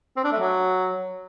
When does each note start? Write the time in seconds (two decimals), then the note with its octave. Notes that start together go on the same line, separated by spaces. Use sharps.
0.16 C4
0.24 D4
0.32 A3
0.40 F#3